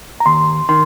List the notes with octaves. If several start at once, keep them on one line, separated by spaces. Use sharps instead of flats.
A#5
D#2 C6
D#3 C6